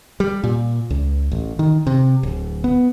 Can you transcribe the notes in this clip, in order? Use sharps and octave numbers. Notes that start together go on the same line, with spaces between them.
G3
A#2
C#2
A1
D#3
C3
D1
B3